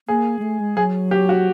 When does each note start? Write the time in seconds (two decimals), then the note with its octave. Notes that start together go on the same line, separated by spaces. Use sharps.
0.08 A#3 G#4
0.39 G#3
0.42 A3
0.60 G#3
0.77 F#3 G#4
1.11 G4
1.29 F#4